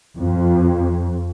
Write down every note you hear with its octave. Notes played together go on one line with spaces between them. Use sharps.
F2